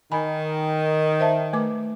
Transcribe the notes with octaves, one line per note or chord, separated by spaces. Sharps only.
D#3 G#5 B5
C5 E5 A5
A3 B4 D6